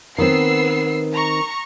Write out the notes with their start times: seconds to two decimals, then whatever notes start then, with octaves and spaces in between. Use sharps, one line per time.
0.18 D#3 B3 C4 E6 C7
1.12 A#5 C#6